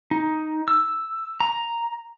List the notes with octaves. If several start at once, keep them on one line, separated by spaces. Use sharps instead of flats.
D#4
E6
A#5